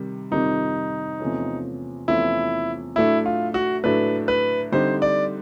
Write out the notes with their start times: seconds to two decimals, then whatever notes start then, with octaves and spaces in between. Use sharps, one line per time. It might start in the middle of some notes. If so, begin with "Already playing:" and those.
Already playing: C3 D#3 G3
0.31 F2 C3 D#3 G3 C4 D#4
1.20 E2 C3 F3 A3 C#4
2.08 E2 C3 F3 A3 C#4 E4
2.96 A2 F#3 A3 D4 E4
3.26 F4
3.54 F#4
3.84 A2 F#3 A3 D4 B4
4.28 B4
4.72 D3 G3 C4 D#4 C5
5.02 D5